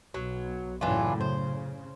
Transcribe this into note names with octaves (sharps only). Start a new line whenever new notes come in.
B1 F#3
F#2 A2 C#3 E3 D4 F4
C#3 C5